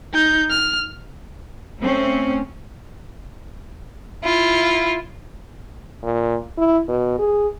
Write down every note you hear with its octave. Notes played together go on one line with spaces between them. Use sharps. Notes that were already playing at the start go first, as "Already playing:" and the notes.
D#4 G6
F6
A3 C4 C#4
E4 F4
A#2
E4
B2
G#4